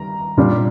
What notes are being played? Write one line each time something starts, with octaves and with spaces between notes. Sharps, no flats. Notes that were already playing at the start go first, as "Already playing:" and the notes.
Already playing: D#3 G3 A#5
A#2 G3 D4